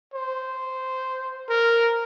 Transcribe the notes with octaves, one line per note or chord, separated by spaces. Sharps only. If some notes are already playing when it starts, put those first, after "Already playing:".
C5
A#4